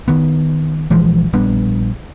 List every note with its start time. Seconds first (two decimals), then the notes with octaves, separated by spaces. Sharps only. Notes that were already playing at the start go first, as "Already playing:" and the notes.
0.08 D#3 B3
0.90 A#1 E3 F3 G#3
1.33 A#1 G3 B3 D4